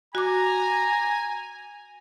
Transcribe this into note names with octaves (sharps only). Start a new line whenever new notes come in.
F#4 G#5 A#5 D6